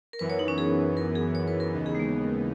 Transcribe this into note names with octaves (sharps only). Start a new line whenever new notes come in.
A#4
F#2 E3 B3 B4
C#5
D#4
C#4
G#4
A#4
G#4
C#5
B4
A#4
D#2 C#3 E3 B3 D#4
G#4
G#3
A#3